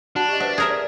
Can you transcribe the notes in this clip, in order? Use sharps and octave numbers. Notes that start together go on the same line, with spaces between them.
D4 F#4 F#5 A5
G4 D#5
B4 C5 E5 F#5
G#4 A#4 E5
D5